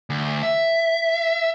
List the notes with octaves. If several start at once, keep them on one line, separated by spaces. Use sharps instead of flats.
D2
E5